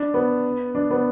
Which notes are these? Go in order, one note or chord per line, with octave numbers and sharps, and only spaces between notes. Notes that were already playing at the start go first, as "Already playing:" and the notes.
Already playing: D4
B3
D4
B3